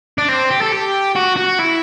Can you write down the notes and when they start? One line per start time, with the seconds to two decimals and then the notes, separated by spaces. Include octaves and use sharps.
0.18 D4
0.28 C4
0.50 G4
0.61 A4
0.72 G4
1.16 F#4
1.37 F#4
1.59 E4